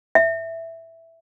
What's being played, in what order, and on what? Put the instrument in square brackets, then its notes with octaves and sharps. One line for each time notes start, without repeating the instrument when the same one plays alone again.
[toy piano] E5